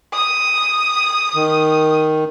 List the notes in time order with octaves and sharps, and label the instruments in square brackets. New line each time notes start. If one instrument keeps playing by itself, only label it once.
[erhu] D#6
[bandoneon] D#3